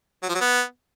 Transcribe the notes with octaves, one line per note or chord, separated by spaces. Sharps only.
F#3
F3
F#3
B3